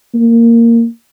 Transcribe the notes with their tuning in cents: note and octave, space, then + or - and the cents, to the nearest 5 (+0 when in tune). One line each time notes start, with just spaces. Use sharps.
A#3 -10